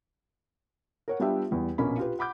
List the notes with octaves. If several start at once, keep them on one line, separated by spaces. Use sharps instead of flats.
A#4 C#5 F#5
G3 B3 D4 F4 G4 E5
E2 G3
A#1 B2 A#3 C#4 B5
F4 G4 B4
F#5 B5 D6 G6